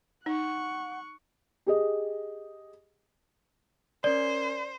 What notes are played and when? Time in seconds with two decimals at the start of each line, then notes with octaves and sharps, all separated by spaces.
0.26 D#4 F#5 C#6 F#6
1.67 G4 G#4 D#5
4.04 C#4 A#4 C5 D5 G#6